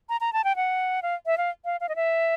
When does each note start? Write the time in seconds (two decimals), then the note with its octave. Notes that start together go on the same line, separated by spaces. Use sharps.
0.09 A#5
0.21 A#5
0.33 A5
0.44 G5
0.56 F#5
1.02 F5
1.26 E5
1.38 F5
1.65 F5
1.81 F5
1.89 D#5
1.96 E5